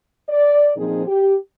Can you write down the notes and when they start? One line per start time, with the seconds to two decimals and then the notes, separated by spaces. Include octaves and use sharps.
0.29 D5
0.75 A#2 F3 C4 D#4 G#4
1.07 G4